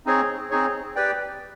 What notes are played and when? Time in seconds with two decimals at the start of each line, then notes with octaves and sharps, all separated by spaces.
0.06 C4 D#4 G#4 C#5
0.51 C4 D#4 G#4 C#5
0.96 G4 B4 D5 G5